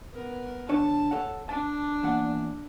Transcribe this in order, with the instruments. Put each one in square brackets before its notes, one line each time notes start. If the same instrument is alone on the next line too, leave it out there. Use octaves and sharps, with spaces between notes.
[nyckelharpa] B3 A#4
[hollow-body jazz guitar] D3 D4 C#5 [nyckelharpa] A5
[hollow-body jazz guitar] A4 C#5 F#5
[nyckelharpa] D4 [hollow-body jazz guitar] A5
[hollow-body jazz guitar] E2 A#2 F#5